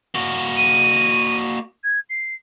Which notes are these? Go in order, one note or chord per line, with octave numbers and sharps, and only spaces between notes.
A#3 F#4
D#7
G#6
C7